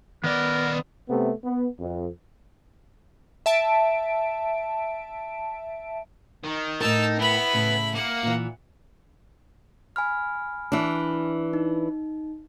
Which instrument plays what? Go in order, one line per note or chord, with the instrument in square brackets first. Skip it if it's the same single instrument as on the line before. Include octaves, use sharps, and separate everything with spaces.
[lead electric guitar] D#3 D5 [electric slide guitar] B3 [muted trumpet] A#4
[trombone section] C3 A3 B3
B3
F2
[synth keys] E5 A5 D7
[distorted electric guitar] D#3
[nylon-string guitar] A2 A#4 [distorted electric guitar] D#4 [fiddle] A5 E6
[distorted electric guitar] B3 [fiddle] E4 B5
[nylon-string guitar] A2 C#3
[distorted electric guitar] A#3 [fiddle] F#5
[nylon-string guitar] A#2 E3
[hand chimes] G#5 B5 F6
[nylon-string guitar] E3 D4
[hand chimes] D#4